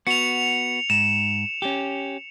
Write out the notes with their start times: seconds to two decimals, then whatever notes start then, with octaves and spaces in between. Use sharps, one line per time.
0.07 B3 F#4 C#7 F7
0.90 G#2 E7
1.62 C#4 G4